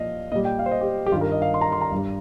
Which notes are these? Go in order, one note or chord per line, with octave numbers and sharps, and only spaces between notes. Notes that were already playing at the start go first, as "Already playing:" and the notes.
Already playing: A#2 F3 D#5 F5
A#2 G3 D#5
G5
F5
C5
D#5
G4
G4
G2 D#3 G3 F4
A#4
D#5
F5
C6
A#5
C6
A#5
G2 G3